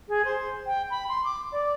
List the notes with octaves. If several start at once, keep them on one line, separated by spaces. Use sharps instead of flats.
G#4
C5
G5
B5
C6
D6
D5